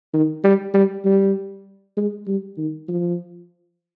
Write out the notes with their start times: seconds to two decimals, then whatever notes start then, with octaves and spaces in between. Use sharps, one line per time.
0.13 D#3
0.44 G3
0.74 G3
1.05 G3
1.97 G#3
2.27 G3
2.58 D#3
2.88 F3